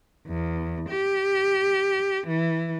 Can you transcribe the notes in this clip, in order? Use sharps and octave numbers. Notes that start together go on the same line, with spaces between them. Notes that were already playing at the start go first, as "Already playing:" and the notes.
E2
G4
E3